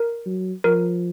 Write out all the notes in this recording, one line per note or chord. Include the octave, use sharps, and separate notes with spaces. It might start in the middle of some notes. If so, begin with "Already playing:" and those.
Already playing: A#4
F#3
F3 A#4